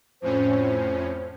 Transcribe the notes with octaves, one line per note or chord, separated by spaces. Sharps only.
F2 A2 C#4 C5